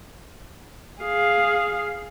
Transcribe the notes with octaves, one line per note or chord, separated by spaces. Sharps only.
G#4 F5